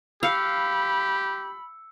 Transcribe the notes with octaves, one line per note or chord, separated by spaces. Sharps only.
G4 F5 B5 E6 C#7